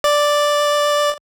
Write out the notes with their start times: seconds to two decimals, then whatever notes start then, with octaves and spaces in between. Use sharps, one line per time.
0.04 D5